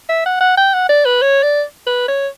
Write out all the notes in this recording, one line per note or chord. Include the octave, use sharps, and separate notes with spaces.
E5
F#5
F#5
G5
F#5
D5
B4
C#5
D5
B4
C#5